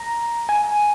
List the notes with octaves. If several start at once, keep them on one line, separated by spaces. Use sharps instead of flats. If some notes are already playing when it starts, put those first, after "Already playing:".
Already playing: A#5
G#5